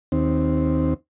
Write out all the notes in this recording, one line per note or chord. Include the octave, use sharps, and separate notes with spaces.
D#2 C4